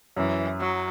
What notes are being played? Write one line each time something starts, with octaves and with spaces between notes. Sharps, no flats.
F#2 E3
F#3